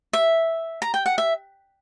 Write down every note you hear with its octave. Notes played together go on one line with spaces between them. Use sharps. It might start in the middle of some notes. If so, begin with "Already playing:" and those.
E5
A#5
G5
F#5
E5